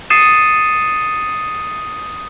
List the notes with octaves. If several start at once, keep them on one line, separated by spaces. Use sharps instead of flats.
D#6 A6 C7 C#7 D#7 E7